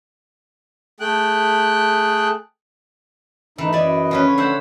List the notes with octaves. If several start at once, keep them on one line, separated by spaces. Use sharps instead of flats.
A3 G#4 G5 F#6
G2 E3 A3 D#4
F#2 D5 D#5 G#5 B5
F3 C#4 B4
D3 C#5
C5 E5 F#5